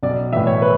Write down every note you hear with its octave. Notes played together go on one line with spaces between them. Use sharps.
B1 D5
A2 E3 E5
C#5
B4